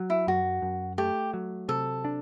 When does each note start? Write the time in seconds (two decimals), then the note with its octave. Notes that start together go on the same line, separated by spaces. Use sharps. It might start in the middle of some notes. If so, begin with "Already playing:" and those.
Already playing: F#3
0.10 E4
0.27 F#2 F#4
0.62 F#2
0.98 A3 G4
1.33 F#3
1.68 C3 A4
2.05 D4